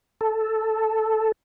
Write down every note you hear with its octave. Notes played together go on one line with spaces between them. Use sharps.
A4